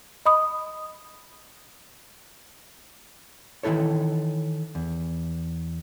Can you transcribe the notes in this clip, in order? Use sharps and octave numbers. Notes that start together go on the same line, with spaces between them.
D#5 B5 D#6
D#3 E3 E4 A4 C#5
E2